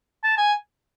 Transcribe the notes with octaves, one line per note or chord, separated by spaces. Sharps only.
A5
G#5